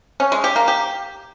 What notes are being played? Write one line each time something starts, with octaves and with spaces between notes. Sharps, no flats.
C#4
G#3
G4
A#3
G4